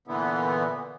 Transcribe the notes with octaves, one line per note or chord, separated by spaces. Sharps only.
A#2 D3 E3 B3